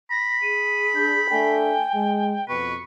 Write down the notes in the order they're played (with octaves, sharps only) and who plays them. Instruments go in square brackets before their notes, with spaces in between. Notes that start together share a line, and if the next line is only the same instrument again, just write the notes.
[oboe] B5 [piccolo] A#6
[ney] G#4 [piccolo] D#7
[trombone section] D4 [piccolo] G6
[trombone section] A3 D4 A4 [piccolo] G5 [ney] G#5
[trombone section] G#3
[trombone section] F2 B2 [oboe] B4 [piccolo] C#6